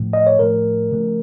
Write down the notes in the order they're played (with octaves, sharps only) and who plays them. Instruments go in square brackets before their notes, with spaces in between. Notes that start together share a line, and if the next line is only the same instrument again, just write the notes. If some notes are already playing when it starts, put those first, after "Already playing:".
Already playing: [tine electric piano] A2 F3 A3
D#5
C#5
A2 F3 A3 A#4
C#3 F3 A3